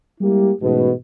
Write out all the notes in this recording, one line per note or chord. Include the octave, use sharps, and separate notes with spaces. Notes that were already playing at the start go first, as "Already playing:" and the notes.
G3 G#3 A#3 E4 G4
A1 G#2 B2